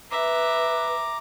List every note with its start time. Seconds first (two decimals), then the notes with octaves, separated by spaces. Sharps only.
0.11 B4 E5 A#5 D6